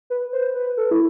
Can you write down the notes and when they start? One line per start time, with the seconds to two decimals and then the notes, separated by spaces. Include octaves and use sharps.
0.10 B4
0.33 C5
0.55 B4
0.77 A4
0.91 E4